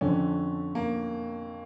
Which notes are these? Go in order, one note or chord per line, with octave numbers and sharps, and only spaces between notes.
F2 D3 F3 C#4
A#3